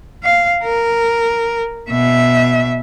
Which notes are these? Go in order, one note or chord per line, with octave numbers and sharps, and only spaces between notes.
F5
A#4
B2 E5